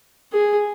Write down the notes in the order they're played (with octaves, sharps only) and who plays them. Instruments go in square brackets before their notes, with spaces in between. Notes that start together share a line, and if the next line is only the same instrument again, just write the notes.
[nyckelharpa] G#4